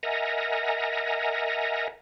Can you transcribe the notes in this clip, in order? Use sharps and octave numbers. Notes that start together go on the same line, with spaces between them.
A#4 D#5 E5 F#5 G#5 A#5